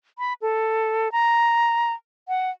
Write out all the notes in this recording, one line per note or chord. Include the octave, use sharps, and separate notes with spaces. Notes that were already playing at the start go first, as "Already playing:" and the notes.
B5
A4
A#5
F#5